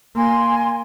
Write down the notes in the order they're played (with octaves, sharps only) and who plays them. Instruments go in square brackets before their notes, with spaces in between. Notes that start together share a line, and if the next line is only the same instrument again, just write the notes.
[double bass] A#3 [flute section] G#5 C6